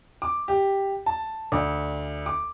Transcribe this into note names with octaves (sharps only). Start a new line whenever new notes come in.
D6
G4
A5
D2
D6